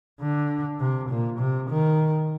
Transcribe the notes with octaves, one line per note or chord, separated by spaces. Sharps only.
D3
C3
A#2
C3
D#3